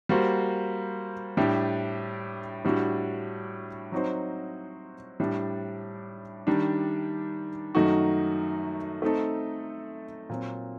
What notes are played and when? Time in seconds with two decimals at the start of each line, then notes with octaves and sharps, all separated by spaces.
0.09 G3 A#3 F#4 C5
1.37 A2 G3 D4 G4
2.64 A2 G3 D4 F#4
3.92 F#3 C4 D#4 F#4 C5
5.20 A2 G3 D4
6.47 D#3 G3 D4
7.75 F#2 D#3 A3 D#4 F#4
9.02 A3 C4 D#4 A4
10.29 A#2 F#3 C4